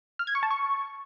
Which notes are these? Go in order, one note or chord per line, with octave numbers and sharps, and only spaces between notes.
F6
G#6
C#6
A5
C#6